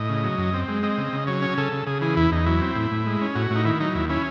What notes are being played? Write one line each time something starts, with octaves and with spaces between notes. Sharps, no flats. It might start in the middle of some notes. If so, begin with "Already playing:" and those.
Already playing: A2 D#5
C#3
F#3
F#2
C4
G#3
C4 D#5
C#3
C#3
F#3 C#5
C#4
C#3 A4
C#3
C#3 G#4
E3 G#4
E2 E4
E2 D#4
F#3 E4
C4
A2
A2
G#3
C#4
A2 F#4
A2 D#4
D#3 E4
F#3 D#4
D#2 E4
C#4 E4